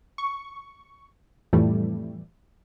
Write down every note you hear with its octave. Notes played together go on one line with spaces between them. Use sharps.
C#6
F2 A2 E3 G3 A3